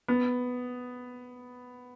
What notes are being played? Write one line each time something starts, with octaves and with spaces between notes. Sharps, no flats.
B3